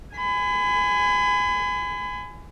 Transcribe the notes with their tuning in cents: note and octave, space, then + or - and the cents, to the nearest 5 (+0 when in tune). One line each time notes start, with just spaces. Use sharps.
G#5 +0 B5 +35